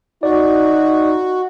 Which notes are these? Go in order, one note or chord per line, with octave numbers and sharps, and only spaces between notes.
D#4 F#4 D5